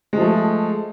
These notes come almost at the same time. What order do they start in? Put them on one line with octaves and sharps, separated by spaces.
G#3 F3 A3